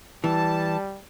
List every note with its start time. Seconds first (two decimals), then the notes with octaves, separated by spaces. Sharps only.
0.24 E3 G3 A5